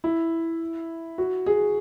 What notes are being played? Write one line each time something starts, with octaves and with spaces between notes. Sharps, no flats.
E4
F#4
G#4